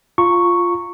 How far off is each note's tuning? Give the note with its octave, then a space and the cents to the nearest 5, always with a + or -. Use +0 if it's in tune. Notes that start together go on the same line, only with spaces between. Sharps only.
F4 +0 A#5 -20 C#6 +0